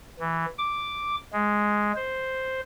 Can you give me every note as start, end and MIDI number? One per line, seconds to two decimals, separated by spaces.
0.20 0.46 52
0.58 1.16 86
1.33 1.92 56
1.96 2.61 72